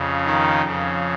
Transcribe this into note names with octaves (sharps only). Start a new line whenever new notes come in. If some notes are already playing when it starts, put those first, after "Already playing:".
Already playing: F2 C#3
D#3 D#4
F2 C#3